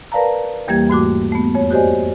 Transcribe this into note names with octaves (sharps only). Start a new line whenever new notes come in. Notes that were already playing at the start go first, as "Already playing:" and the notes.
A#4 B4 D5 F5 A5 A#5
E2 E3 G3 A#3 G4 G#6
G#2 A3 F#4 D6
A3 B3
F2 C#5
F#4 G4 C5 D5 D#5 G#5